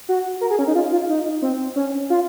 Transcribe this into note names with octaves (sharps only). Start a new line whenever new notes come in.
F#4
A#4
G#4
C#4
D#4
F4
F4
D#4
C4
C#4
F4